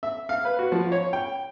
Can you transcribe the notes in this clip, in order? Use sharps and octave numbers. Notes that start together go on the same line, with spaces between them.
E5
F5
B4
F#4
F3
C#5
G5